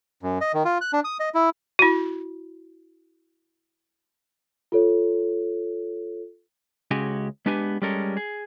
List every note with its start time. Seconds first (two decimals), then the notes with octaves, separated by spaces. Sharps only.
0.23 F#2
0.41 D#5
0.54 D#3
0.65 F4
0.81 F#6
0.93 D4
1.04 D#6
1.20 D#5
1.34 E4
1.79 E4 F#4
4.72 F4 A4 C#5
6.91 C#2 C#3 G#3 F#4 G4 G#5
7.46 G#3 B3 D4 G4 B4 G#5
7.82 G3 G#3 C#4 A4 A#4
8.17 G#4